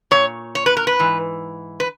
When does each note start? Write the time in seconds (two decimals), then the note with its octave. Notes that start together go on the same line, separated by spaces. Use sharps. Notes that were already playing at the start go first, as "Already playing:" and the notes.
0.11 A#2 C#5
0.55 C#5
0.66 B4
0.77 A#4
0.87 B4
0.99 G#2 E3
1.80 B4